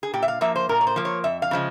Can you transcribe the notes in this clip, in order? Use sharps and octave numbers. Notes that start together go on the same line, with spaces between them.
G#4
A#2 G4
E5
F5
F3 A#3 E5
C5
A#2 A#4
C#5
C5
F3 A#3
C#5
F2 E5
F5
C#3 F3 G#3